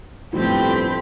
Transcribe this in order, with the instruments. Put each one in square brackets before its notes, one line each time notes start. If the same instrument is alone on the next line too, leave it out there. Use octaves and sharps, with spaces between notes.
[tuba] G1 [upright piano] F2 A2 [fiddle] C4 G4 [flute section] C5 B5